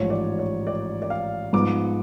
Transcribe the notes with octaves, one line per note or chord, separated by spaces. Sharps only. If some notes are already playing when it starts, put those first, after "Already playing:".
Already playing: A1 G#2 F3 C#5
D5
C#5
D5
D5
F5
G#2 F3 B3 D6